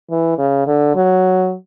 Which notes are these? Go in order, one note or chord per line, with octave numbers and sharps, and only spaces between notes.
E3
C#3
D3
F#3